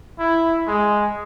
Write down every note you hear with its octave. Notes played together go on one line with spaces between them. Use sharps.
E4
G#3